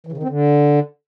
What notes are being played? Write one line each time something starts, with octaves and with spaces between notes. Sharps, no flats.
E3
C#3
D#3
C4
D3